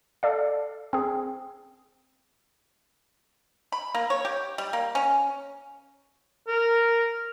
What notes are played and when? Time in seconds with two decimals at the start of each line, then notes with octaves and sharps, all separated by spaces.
0.23 A4 D5 F5
0.93 C4 G#4
3.72 B5
3.95 A#3
4.10 C#5
4.25 G4
4.58 G3
4.73 A#3
4.95 C#4
6.48 A#4